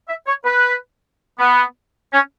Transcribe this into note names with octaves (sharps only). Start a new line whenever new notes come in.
E5
C#5
B4
B3
C#4